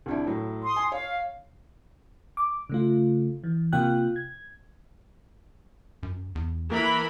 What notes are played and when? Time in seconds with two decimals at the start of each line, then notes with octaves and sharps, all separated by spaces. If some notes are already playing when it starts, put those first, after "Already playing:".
0.06 C2 D4 E4
0.27 A2 F#3
0.64 C6 D#6
0.76 G#5
0.92 C#5 F5
2.37 D6
2.70 C#3 A3 F4
3.44 E3
3.72 C3 A#3 F4 G5 F#6
4.16 G#6
6.03 F#2
6.35 E2
6.71 E3 A#3 A#4 B5